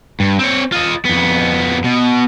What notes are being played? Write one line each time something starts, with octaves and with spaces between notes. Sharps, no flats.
G2
C4 C#5
F4 D#5
F2 B3
B2